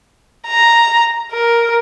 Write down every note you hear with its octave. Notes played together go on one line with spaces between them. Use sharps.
A#5
A#4